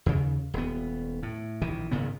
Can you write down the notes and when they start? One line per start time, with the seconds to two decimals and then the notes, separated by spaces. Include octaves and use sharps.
0.06 D#2 C#3
0.54 D#1 B3
1.23 A2
1.62 A#1 D#3 E3
1.91 G#1 A#2 C#3 B3